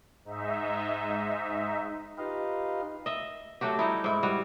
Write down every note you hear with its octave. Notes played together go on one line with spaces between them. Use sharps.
G#2 D#4 E5
D#4 F4 G4 B4 D#5 F5
D#5 E5
F#3 A3 F#4 G4
G3 D#4 E4
G#2 E4
G3 F#4